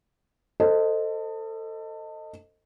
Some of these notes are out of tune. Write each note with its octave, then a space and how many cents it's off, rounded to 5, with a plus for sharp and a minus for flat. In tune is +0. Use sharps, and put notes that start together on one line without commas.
A4 +25 C5 +0 D#5 +0